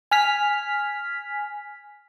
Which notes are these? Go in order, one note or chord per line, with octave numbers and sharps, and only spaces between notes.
G#5 F6 B6